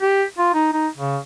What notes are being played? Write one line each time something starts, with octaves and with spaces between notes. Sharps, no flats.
G4
F4
D#4
D#4
C#3